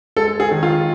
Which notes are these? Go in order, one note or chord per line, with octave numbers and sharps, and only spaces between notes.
G#3 A4
G#4
D#3
F4